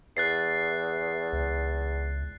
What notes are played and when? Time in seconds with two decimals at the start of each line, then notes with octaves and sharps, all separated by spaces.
0.17 E2 F#6 A6 C7
1.33 C#2